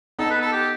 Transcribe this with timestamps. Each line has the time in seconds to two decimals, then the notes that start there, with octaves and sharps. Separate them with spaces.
0.19 B3 D#4 A4
0.30 B4
0.41 A4
0.52 G4